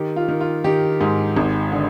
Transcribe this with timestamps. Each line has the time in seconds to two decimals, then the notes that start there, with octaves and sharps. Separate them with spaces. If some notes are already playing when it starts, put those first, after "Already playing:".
Already playing: D#3 G4
0.16 F4
0.28 D#3
0.41 F4
0.64 D#3 G4
1.01 G#2
1.36 G#1
1.72 D3